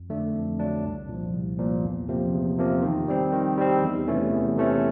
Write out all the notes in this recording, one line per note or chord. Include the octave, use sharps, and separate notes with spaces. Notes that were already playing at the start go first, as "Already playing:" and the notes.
Already playing: F2
D3 F#3 A3 D4
F2
D3 F#3 A3 D4
C2
A#2 F3
C2
A#2 F3
E2
C3 F3 A#3
E2
C3 F3 A#3
D#3
G3 C4
D#3
G3 C4
E2
C3 E3 A3 C#4
E2
C3 E3 A3 C#4